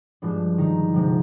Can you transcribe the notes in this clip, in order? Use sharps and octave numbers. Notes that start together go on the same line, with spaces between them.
G2 F3 G#3 D4
D#3 D#4
D2 C3 F3 G#3